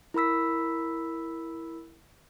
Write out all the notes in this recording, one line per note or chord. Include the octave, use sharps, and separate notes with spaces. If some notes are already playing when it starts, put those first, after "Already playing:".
E4 A#4 B5 E6 B6